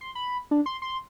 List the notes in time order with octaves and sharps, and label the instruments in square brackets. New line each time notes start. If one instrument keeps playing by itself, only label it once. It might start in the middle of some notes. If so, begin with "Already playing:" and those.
[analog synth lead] C6
B5
D4
C6
C6